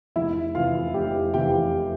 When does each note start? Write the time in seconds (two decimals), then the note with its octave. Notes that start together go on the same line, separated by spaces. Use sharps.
0.16 F1 E4 E5
0.55 E2 C3 F4 F5
0.94 F1 G4 G5
1.34 E2 C3 G4 G5